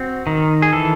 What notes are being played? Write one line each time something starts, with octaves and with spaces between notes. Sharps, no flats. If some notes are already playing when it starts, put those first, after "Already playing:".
Already playing: C4 F#4
D#3
G#4
E3 A4